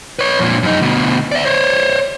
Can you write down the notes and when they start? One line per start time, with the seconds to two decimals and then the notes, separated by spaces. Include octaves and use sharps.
0.19 B4 C#5
0.39 F2 A#2
0.63 F#2 D#4
0.81 D2 B2
1.32 D5 E5
1.45 C5 C#5